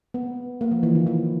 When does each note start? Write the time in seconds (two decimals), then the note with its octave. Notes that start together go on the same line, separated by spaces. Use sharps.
0.14 B3
0.61 A#3
0.71 F3
0.83 E3
0.95 D#3
1.07 E3